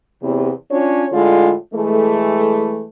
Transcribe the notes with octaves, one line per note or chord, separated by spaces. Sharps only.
E2 C3
C#4 D4 F4 C#5
A2 D3 G#3 F4
E3 G#3 A3